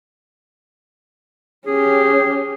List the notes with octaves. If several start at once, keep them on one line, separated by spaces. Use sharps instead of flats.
C#4 G4 G#4